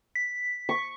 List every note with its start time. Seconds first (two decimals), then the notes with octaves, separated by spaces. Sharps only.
0.15 B6
0.69 C#6